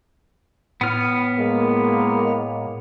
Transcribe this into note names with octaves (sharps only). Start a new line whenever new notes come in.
A2 B3 F6
G#3 A#3